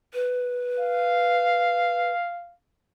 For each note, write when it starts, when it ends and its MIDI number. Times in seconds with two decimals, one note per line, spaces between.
0.14 2.11 71
0.80 2.53 77